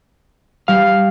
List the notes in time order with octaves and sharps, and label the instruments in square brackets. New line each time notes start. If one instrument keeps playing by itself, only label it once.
[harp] G3 [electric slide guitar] F5